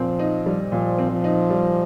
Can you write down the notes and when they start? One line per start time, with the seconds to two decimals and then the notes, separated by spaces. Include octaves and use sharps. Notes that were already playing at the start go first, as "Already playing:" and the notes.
Already playing: A#2 F3 C4
0.19 D#4
0.46 G3
0.72 A#2 F3
0.99 C4
1.11 F3
1.24 D#4
1.50 G3